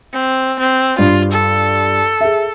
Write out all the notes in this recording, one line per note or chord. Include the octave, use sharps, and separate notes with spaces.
C4
C4
G2 F4
A4
G#4 E5